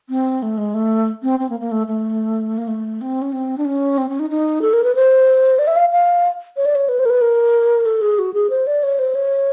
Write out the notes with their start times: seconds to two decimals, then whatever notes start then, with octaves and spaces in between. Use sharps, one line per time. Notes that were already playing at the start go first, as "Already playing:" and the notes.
0.09 C4
0.42 A3
0.58 G#3
0.74 A3
1.23 C4
1.39 C4
1.50 A#3
1.60 A#3
1.71 A3
1.87 A3
2.58 A#3
2.68 A3
3.01 C4
3.22 C#4
3.32 C4
3.58 D4
3.65 C#4
3.98 C4
4.09 C#4
4.19 D#4
4.30 D#4
4.62 A4
4.73 A#4
4.84 B4
4.95 C5
5.59 D5
5.67 E5
5.76 F5
5.92 F5
6.57 C#5
6.66 D5
6.75 C#5
6.89 B4
6.99 C5
7.05 A#4
7.10 B4
7.22 A#4
7.86 A4
8.01 G#4
8.19 F#4
8.34 G#4
8.50 C5
8.67 D5
8.83 C#5
8.99 C5
9.15 C#5